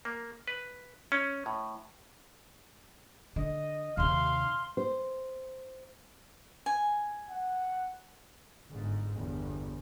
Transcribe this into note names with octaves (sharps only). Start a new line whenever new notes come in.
A#3
B4
C#4
A2
D3 D#5
D#2 C3 F5 C6
C5
G#5
F#5
G1 G#2
G1 E2